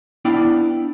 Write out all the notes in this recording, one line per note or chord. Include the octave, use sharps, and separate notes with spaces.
B3 D4 E4 F5 G5